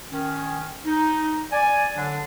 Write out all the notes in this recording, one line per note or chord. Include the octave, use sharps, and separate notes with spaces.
D#3 C#4
D#4
D5 G#5
D3 F#3 D4